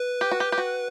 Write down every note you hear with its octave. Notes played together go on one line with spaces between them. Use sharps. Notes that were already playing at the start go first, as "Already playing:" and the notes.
Already playing: B4
G4
F#4
G4
G4
F#4